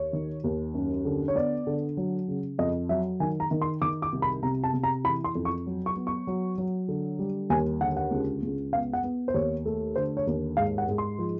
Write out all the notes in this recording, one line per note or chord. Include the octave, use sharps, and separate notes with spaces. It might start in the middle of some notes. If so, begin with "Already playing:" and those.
Already playing: D#2 C#5
D#3
D#2
F#2
D3
C#5
B3 D5
D3
F#3
C#3
F2 D#5
F#3 E5
D#3 G#5
A#5
D#3
C6
D#3 D6
D6
C2
B5
C3 A#5
A5
C3
A#5
E3 B5
C6
F2
C#6
F#3
C#6
B3
C#6
F#3
F#3
D3
G3
D#2 G#5
D3 F#5
F#5
C#2
C#2
B3 F5
F#5
B3
C5
D#2 C#5
A3
D3 C5
C#5
D#2
G#2 F5
F#5
G#2
C6
F3